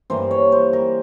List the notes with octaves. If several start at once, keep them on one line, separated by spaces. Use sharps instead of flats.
G2 E3 A#3 C5
C#5
C5
A#4